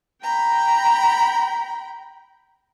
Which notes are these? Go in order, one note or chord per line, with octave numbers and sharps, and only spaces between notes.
G5 A#5 B5